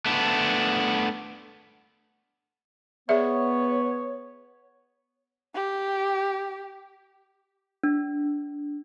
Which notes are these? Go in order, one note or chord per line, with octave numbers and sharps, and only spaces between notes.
A3 B3 D4
B3 G#4 C#5 D5 E5
G4
D4